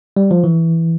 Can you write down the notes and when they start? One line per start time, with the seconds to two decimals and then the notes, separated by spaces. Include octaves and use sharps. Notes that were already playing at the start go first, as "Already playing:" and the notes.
0.17 G3
0.31 F3
0.44 E3